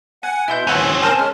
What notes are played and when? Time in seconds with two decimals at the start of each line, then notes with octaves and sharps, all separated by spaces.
0.23 F#5 G#5
0.48 B2 E4 C6 G6
0.67 D#2 C4 C#4 B4 F#5 G#5
1.02 A#4 C5 G#5 A5
1.19 G#3 C#4 F6